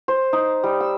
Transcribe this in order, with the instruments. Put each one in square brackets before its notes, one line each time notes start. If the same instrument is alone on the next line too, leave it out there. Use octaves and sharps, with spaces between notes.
[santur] C5
D#4
G3
E6